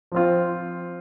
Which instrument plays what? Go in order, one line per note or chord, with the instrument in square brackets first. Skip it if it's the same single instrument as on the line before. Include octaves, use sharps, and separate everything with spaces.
[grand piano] F3 C4 F4